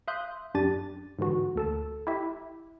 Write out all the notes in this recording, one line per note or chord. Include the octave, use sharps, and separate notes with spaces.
E5 F5 C6 D#6 F#6 G6
F#2 D4 G4 A6 D#7
G#2 D3 E3 F#4
D2 A4 A5
E4 G4 E5